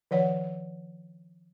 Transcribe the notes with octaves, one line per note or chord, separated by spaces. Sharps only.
D#3 F3 C#5 F#5